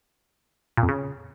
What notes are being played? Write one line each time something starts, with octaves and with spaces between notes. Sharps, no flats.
A#2
F2
C#3